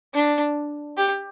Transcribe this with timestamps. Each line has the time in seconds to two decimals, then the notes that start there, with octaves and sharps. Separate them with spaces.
0.14 D4
0.97 G4